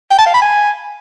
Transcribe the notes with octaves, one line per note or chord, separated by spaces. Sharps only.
G5
A5
F5
B5
G#5